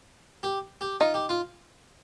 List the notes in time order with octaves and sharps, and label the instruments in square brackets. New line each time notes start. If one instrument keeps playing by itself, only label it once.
[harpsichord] G4
G4
[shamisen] D#4 [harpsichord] F4
[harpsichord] G4
F4